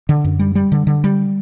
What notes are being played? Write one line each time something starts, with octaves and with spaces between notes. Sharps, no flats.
D3
F#2
G3
G3
D3
D3
G3